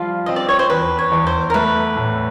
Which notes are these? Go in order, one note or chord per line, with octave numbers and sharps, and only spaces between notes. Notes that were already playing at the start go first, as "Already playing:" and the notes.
Already playing: F3 G3 F4 F5
C4 D#5
D5
C#5
C5
E2 B4
C#5
E2
C5
A#4
A3 B4
A2